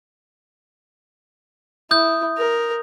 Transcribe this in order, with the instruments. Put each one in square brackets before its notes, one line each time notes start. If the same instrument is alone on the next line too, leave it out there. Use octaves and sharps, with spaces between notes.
[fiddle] E4 [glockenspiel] D#6 G6
[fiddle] A#4